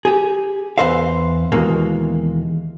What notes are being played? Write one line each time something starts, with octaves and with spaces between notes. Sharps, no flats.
G4 G#4
E2 E3 B4 C5 E5 F5
D#2 B2 E3 G#3 A#3